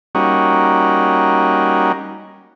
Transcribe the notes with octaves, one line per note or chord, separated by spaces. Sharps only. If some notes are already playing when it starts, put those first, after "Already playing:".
G3 A#3 C#4 D#4 F#4